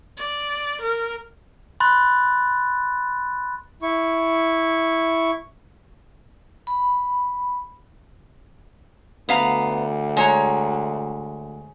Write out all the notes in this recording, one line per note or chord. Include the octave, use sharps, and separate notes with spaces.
D5
A#4
B5 C6 F#6 A6
E4 C#6
B5
D2 B3 F5 A#5
G#3 C#5 A#5